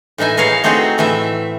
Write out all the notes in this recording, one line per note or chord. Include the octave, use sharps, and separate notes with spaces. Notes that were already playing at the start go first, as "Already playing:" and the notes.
A2 E3 D#4 E5 G#5
E3 G#4 A#4 C#5 F5
A3 C4 D#4 F#4 G#4
A2 E3 A3 E5